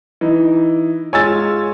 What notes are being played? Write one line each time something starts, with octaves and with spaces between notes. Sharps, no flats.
E3 D#4
G#3 F4 C#5 G#5 E6 A6